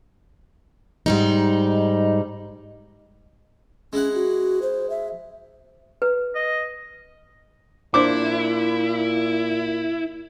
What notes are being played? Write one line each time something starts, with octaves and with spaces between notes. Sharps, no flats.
G#2 G3 D#4
G#3 C#4 E4 F#5
F#4
C5
E5
B4
D#5
A#2 D4 E4 C5 D6